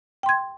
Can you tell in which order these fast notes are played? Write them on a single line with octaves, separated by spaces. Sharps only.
G5 C6 G#6